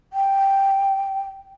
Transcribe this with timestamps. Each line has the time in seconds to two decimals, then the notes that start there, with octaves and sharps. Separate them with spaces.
0.13 G5